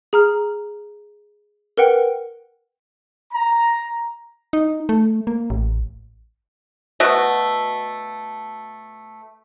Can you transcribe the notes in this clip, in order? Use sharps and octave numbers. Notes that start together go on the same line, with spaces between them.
G#4 A#5 F6
A#4 B4 F#5 G5
A#5
D#4
A3
A#3
A1
B2 A3 F#4